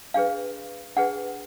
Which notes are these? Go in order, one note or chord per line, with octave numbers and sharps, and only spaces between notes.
D4 G#4 B4 F5
D4 G#4 B4 F#5